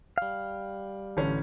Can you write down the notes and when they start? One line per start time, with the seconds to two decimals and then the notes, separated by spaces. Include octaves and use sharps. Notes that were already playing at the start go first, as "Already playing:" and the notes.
0.18 G3 F5
1.17 A1 D3 C#4